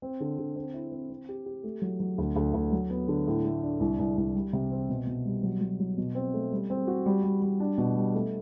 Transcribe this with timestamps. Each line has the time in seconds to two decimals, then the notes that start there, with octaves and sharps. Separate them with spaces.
0.02 C4
0.20 D3
0.38 D3
0.56 C4
0.74 E4
0.92 C4
1.10 C4
1.29 G4
1.46 G4
1.64 A3
1.82 F#3
2.00 F#3
2.18 D2
2.36 D2
2.54 D2
2.72 F#3
2.90 B3
3.08 D3
3.27 A2
3.45 A3
3.62 D4
3.80 C2
3.99 C2
4.17 C2
4.35 G3
4.53 C3
4.71 C4
4.89 B2
5.07 B2
5.25 G3
5.43 F#3
5.61 F#3
5.80 F#3
5.98 B2
6.15 C4
6.34 A3
6.52 G3
6.70 C4
6.87 F#4
7.06 G3
7.23 G3
7.42 G3
7.60 D4
7.78 B2
7.96 G3
8.15 A3